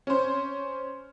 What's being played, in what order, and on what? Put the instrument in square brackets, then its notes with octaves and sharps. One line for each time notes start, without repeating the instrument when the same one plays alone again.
[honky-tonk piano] C#4 C5